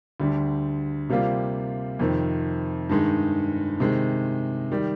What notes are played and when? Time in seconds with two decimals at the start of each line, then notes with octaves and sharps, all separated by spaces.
0.20 D2 D3 G3
1.09 C3 G3 A#3 F4
1.99 F2 C3 D#3
2.89 G2 D#3 G#3 D#4
3.80 C3 D#3 G#3
4.72 D#3 G3